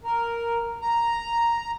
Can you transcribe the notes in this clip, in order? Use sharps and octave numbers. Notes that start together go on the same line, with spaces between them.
A#4
A#5